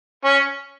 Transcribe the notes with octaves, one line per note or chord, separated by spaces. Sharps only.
C#4